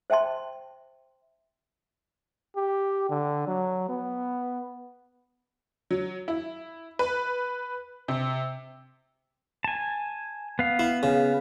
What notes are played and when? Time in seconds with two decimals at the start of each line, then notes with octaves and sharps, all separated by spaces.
0.10 C5 E5 G5 A5 C6
2.56 G4
3.10 D3
3.47 F#3
3.89 B3
5.91 F#3
6.28 E4
6.99 B4
8.08 C3
9.64 G#5 A5
10.59 B3 F5
10.79 E4
11.03 C#3